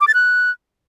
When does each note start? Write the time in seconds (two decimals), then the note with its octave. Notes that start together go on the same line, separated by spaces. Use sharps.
0.01 D6
0.08 A6
0.14 F#6